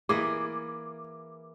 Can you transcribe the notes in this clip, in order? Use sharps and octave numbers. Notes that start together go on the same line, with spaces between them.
E3 A#3 G#4 D6